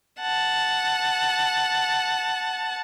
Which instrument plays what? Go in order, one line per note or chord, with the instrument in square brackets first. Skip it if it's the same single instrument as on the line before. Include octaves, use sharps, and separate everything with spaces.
[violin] F#5 A5